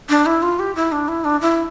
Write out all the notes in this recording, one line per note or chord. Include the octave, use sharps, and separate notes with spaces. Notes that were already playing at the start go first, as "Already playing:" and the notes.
D4
E4
F4
G4
E4
D4
E4
D4
E4